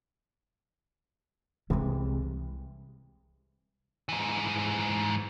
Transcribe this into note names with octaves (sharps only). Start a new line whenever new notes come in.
C2 C3 E3 G#3 C#4
G#2 E3